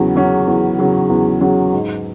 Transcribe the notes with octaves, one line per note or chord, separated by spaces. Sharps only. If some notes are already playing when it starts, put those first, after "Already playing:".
Already playing: E2 C#3 F#3 C#4
C#3 F#3 C#4
E2
C#3 F#3 C#4
E2
C#3 F#3 C#4
G#2